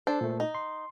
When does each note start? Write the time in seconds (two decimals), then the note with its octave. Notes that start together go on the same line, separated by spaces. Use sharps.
0.07 D4 A4 C5
0.21 A#2 A3
0.40 D#4
0.55 C6